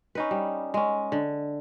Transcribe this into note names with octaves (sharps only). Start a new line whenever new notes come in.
C#4 D#4 B4
G3
G#3 C#4
D3